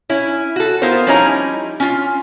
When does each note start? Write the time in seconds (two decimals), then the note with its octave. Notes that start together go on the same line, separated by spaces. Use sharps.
0.10 C#4 E4
0.56 F#4 A4
0.82 B3 E4 F4 A#4 C5
1.07 F3 G3 C#4 D#4 E4 A#5
1.80 C#4 F4